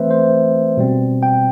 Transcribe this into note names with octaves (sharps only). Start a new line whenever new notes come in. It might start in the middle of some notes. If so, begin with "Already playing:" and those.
Already playing: E3 A3 C4 B4 C5 E5
C5
B2 G3 C4
G5